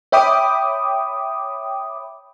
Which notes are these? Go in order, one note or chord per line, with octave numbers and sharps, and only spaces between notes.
C#5 E5 G5 B5 D6 D#6